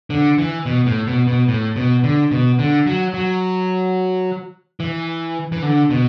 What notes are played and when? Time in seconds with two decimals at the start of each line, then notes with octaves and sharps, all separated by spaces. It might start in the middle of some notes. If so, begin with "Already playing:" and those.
0.10 D3
0.38 E3
0.66 B2
0.86 A2
1.07 B2
1.27 B2
1.48 A2
1.76 B2
2.04 D3
2.31 B2
2.59 D3
2.87 F#3
3.14 F#3
4.80 E3
5.52 E3
5.63 D3
5.90 B2